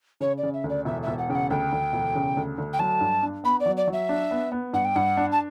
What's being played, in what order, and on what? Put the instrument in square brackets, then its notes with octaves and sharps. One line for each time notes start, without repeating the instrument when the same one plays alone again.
[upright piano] C#3 [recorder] C#5
[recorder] D5
[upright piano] C#3
[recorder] E5
[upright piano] D2
[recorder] D5
[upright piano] E1 [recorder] E5
[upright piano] E1 [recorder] E5
[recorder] F#5
[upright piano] C#3 [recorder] G5
[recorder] F#5
[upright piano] D2 [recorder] G5
[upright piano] D2
E1
C#3
D2
D2
[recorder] G5
[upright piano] F#3 [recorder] A5
[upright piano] G2
D4
[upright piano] B3 [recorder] B5
[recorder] D5
[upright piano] F#3
[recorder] D5
[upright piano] F#3 [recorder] E5
[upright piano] D4
B3
B3
[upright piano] G2 [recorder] F#5
[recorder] G5
[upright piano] G2 [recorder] F#5
[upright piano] D4
[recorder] A5